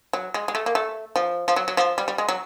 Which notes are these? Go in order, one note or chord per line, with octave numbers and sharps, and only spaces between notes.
F#3
G#3
G#3
A3
A#3
A3
F3
F3
F#3
F#3
F3
G3
G3
G#3
F#3